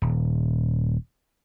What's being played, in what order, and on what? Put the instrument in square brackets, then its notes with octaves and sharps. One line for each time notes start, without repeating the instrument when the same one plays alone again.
[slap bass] D#1